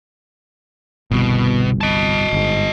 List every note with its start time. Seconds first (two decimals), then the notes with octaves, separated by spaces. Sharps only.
1.11 G1 C2 B2
1.81 D#5 A5
2.33 G1 G#2